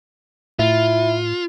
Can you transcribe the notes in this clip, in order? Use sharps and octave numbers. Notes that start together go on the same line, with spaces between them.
A2 E4 F4